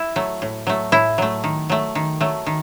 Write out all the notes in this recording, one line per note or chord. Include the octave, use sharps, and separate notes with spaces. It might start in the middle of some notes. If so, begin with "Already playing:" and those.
Already playing: E4
F#3 A3
A2
F#3 A3
A2 E4
F#3 A3
D#3
F#3 A3
D#3
F#3 A3
D#3